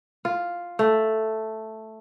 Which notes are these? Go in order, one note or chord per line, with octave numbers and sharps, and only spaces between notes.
F4
A3